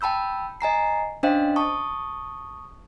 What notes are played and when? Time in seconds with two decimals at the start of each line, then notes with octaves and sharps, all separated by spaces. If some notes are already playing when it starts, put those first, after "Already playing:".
0.01 G5 A5 B5 E6 G6
0.61 D#5 G#5 A#5 C7
1.23 C#4 D4 C5 D#5 F5 G5
1.56 A5 C#6 D#6